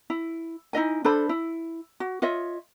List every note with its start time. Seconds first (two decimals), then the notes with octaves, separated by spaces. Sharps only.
0.10 E4
0.73 D#4 E4 D#5 G#5
1.05 D4 A4 C5 B5
1.29 E4
2.00 F#4
2.22 F4 C#5 D#5 E5